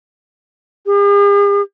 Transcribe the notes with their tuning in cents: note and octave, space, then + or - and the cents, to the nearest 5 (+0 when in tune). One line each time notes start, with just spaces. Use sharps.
G#4 -45